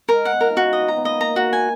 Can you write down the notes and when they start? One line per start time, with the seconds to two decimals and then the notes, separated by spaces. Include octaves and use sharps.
0.09 G#3 A#4
0.25 F#5
0.33 B3
0.41 F4 A#4
0.49 D#4
0.57 C#4 F#4
0.73 D#5
0.81 B3
0.88 A#5
0.96 B3
1.04 A#3 D#5
1.21 A#5
1.36 F#4
1.53 G#5